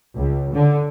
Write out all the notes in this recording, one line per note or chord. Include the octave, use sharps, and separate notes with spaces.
C#2
D3